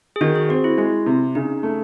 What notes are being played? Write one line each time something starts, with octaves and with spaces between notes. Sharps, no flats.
G#4
D#3 F#4
G#4
C4 F#4
E4
G#3 E4
C3
C#3 D#4
A3